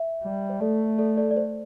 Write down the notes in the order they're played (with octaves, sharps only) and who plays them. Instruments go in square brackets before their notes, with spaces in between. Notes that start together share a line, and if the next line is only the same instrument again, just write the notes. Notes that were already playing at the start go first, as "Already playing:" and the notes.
Already playing: [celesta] E5
[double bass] G3
[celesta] C5
[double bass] A3 [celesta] A4 D5
[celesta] A4 D5
A4 D5
D5
C5